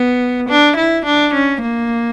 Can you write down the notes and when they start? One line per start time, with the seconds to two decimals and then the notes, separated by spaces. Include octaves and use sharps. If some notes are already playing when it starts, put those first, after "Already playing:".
Already playing: B3
0.49 D4
0.77 E4
1.05 D4
1.34 C#4
1.62 A#3